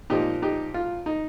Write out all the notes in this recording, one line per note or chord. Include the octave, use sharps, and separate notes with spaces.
A#2 F3 D#4 G4
D#4 G4
F4
D#4